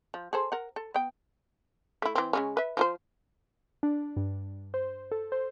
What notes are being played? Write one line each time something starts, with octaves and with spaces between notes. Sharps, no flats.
F3
G#4 A4 C5
A#4 F#5
A4
B3 G5
A3 E4
E3 C4
C#3 G#3 C#4
B4 E5
F3 F4 C5
D4
G2
C5
A4
C5